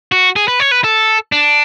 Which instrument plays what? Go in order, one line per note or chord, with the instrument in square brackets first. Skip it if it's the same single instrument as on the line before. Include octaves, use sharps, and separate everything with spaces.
[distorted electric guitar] F#4
G#4
B4
C#5
B4
A4
D4